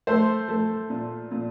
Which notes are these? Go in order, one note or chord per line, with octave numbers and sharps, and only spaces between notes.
A3 C5
A3
A#2
A#2